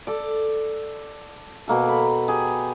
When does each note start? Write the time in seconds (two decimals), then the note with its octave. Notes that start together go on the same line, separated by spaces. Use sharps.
0.07 A4 D5
1.68 B2 A#3 A4
1.89 B5
2.28 G4 G#4